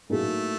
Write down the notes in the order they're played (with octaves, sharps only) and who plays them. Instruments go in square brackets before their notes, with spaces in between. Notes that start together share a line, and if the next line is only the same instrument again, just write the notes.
[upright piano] A2 F#3 A#3 D#4 G#4 [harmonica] A3